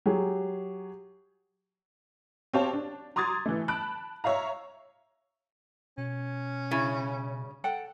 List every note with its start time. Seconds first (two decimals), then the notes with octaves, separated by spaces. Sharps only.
0.06 F#3 G4 G#4
2.53 C4 G4 C#5 F5 A5
2.73 D4
3.16 A#5 C6 D6 D#6 G#6 A6
3.46 E3 A3
3.68 A5 B5 F#6 D7
4.24 C#5 E5 F5 A#5
5.98 B2 C#4
6.71 G2 C#3 E4
7.64 A4 F#5 G5